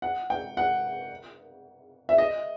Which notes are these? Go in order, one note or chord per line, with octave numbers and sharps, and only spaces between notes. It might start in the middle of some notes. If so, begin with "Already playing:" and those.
F#5
G5
F#5
E5
D#5